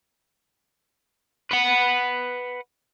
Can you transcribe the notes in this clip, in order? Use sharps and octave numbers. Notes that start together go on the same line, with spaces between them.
B4 F#5